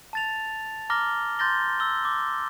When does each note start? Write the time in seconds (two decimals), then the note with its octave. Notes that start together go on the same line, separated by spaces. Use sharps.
0.13 A5 A6 F7
0.90 A#5 D6 F6 A#6 G7
1.39 C6 G6 A6 A#6 G7
1.80 E6 G7
2.05 D6